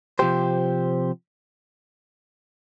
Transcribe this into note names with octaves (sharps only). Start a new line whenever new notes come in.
C3 F3 C4 G4 C5